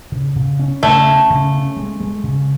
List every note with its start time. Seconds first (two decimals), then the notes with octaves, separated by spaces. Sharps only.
0.12 C#3
0.36 C#3
0.60 C#4
0.83 C#3 A3
1.07 C#4
1.30 C#3
1.54 C#4
1.76 G#3
2.00 G#3
2.24 C#3